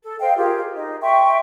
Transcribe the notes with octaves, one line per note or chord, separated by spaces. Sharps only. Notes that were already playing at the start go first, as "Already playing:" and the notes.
A4
C5 D#5 F5 G5
F4 G4 G#4 A#4
D#4 D#5
E5 G5 C6 C#6